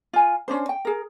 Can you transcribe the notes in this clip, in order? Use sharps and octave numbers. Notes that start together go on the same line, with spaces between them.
F4 G#5
C#4 D4 C5
G5
G#4 A#4